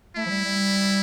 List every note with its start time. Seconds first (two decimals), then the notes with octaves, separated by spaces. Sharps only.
0.16 A3 E4
0.26 F3
0.30 G3
0.45 G3